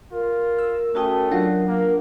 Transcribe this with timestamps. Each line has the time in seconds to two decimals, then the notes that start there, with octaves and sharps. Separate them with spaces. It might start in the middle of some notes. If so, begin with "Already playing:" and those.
0.12 F4 A#4
0.58 E6
0.95 A3 C#4 F#4 G5 A5 D#6
1.31 F#3 D4 F4 F#5
1.68 A#3 A#4